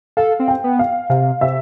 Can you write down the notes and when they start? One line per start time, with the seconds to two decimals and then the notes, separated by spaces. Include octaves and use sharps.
0.17 A4 F5
0.39 C4
0.48 G5
0.64 B3
0.79 F5
1.10 C3 F5
1.41 C3 E5